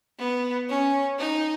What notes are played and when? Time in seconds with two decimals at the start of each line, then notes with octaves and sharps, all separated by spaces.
0.19 B3
0.69 C#4
1.19 D#4